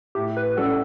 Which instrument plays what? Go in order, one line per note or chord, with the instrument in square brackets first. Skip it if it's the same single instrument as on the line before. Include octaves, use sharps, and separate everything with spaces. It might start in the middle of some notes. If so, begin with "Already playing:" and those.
[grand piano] A2 [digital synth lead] G4
[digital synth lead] B4
[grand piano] G3 C#4 F#4 [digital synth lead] A4